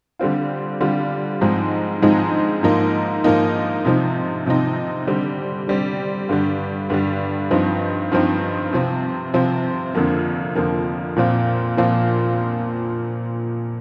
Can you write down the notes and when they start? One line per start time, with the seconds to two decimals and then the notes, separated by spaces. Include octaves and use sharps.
0.19 D3 G3 C4 F4
0.80 D3 G3 C4 F4
1.41 G#2 F3 G#3 C4 D#4
2.02 G#2 F3 G#3 C4 D#4
2.63 G#2 F3 A#3 D#4
3.24 G#2 F3 A#3 D#4
3.85 C3 F3 C4 D#4
4.46 C3 F3 C4 D#4
5.07 D3 G3 C4
5.68 D3 G3 C4
6.29 G2 D3 G3
6.90 G2 D3 G3
7.51 G2 F3 C4 D#4
8.12 G2 F3 C4 D#4
8.73 C3 F3 C4
9.34 C3 F3 C4
9.95 F2 D3 F3 A#3
10.55 F2 D3 F3 A#3
11.16 A#2 F3 C4 F4
11.77 A#2 F3 C4 F4